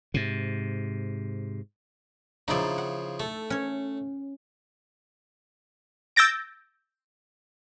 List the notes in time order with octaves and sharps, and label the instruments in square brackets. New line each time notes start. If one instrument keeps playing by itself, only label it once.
[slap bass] G#2 C3
[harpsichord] C#3 F3 [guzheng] D#4 E4 D5
[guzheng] F#5
[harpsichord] A3 [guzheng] A4
[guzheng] C#4 C#5
[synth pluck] E6 G6 A6 A#6 D7